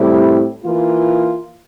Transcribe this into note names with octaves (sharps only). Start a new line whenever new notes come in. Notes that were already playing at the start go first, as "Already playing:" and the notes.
Already playing: A2 G3 C4 E4 G4
E3 A#3 F4